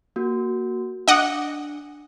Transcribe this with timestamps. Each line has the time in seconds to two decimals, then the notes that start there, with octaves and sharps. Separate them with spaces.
0.16 A#3 F#4
1.08 D4 D#5 F#5 D6